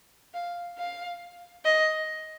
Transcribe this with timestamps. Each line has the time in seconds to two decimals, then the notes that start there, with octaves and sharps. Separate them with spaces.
0.34 F5
0.78 F5
1.65 D#5